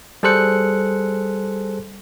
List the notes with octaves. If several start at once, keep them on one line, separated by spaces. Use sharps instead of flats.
G3 G#4 A4 C5 F#6 C#7